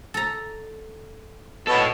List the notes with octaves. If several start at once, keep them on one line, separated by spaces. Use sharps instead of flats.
A4 A#5
B2 A4 C#5 A5